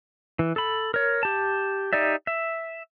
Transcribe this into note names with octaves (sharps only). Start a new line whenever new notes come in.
E3
A4 B5
A#4 C#5
G4 A5
D#4 G4 D5 E5
E5